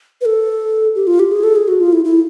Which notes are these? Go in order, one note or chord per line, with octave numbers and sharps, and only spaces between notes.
B4
A4
G4
F4
G4
G#4
A4
G#4
F#4
F4
E4
E4